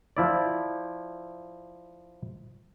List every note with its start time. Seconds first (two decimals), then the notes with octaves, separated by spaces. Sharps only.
0.17 F3 E4 D5